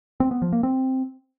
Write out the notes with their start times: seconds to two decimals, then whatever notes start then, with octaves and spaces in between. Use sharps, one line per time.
0.20 C4
0.31 B3
0.42 F3
0.53 A#3
0.63 C4